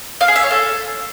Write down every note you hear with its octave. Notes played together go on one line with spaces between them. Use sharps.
F5
G#4
E5
C#5
A4